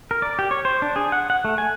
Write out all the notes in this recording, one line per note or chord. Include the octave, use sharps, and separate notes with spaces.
A#4
D5
G4
C#5
C5
D4
G#4
F#5
F#5
A3
G#5